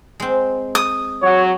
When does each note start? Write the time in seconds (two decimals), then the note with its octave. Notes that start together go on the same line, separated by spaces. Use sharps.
0.20 G#3 C4
0.75 D#6
1.22 F#3 C#5